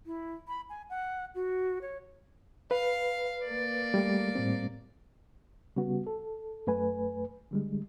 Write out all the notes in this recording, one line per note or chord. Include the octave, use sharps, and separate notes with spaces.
E4
B5
G#5
F#5
F#4
C#5
B4 F5
A#3 D5
G3 A3
A2 G3 C4
C#3 G3 B3 F#4
A4
F#2 A3 B4 G#5
D3 G3 G#3